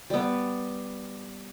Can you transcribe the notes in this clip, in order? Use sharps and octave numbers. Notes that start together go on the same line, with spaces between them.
G3 B3